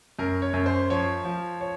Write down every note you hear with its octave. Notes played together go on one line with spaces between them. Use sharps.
F#2 A#4
C#5
F#2
C5
F3 C#5
F3
C#5